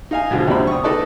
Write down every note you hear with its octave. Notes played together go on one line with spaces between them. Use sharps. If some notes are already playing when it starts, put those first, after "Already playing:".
D#4 F5 G#5
G#2 B2 D3 F3
D#2 C3 C4 D5 B5
C#6 D#6
D#4 A4 B4 D5 A5